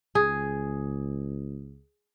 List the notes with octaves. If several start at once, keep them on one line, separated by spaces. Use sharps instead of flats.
C#2 G#4